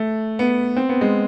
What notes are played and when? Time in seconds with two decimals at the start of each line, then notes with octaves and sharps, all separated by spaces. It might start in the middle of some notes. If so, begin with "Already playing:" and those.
Already playing: A3
0.39 B3
0.77 C4
0.89 B3
1.01 G#3